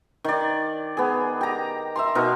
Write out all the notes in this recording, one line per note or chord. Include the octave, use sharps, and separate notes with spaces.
D#3 D5
B3 G#4
G4 A#5
E5 A#5 C6
B2 D#4 A#4